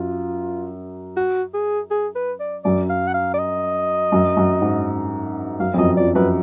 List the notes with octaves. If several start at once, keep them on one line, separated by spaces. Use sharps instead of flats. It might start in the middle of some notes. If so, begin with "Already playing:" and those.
Already playing: F#2 F4
F#4
G#4
G#4
B4
D5
F#2 D5
F5
F#5
F5
D5
D#5
F#2
F#2
G#2
F#2 F5
F2
F#2 D#5
F2 D5
F#2 B4